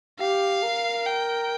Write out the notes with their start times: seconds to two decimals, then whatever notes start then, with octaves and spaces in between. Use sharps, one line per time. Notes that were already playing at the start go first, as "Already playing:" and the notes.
0.20 G4 F5
0.63 A#4
1.06 G5